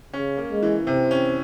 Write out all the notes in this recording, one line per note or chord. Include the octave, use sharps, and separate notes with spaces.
C#3 C#4
A#3
G#3
E3
C3 C4
C#4